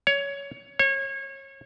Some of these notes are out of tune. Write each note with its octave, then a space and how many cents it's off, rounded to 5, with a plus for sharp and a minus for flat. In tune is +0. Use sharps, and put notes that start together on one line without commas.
C#5 +15
C#5 -30